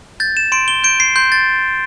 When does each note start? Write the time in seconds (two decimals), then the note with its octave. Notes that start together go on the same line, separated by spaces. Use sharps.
0.20 G6 A6
0.37 E7
0.52 C6 D7
0.68 G7
0.84 G6 D7
1.00 C7
1.16 C6 G6
1.32 A6